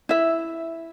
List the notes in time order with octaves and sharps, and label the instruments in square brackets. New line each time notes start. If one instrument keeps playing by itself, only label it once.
[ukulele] E4 E5